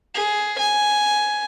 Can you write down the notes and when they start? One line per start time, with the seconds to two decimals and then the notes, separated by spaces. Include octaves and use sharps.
0.15 G#4
0.58 G#5